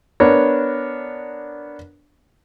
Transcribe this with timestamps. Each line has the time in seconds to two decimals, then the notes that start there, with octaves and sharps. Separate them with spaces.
0.20 B3 D4 A#4 C#5